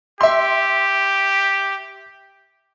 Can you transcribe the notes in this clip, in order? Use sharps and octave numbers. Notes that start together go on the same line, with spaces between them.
G4 E5 C6